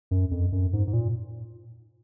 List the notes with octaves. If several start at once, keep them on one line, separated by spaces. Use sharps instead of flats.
F#2
F2
F#2
G#2
G#2
A#2